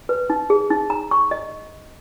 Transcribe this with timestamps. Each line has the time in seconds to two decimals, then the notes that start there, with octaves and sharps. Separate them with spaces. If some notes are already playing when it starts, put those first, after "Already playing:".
0.09 B4
0.30 D#4
0.50 G#4
0.70 D#4
0.90 A#5
1.11 C#6
1.31 D#5